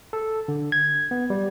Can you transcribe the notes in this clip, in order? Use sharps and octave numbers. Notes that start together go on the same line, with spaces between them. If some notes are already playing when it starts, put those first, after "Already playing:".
A4
D3
G#6
B3
G3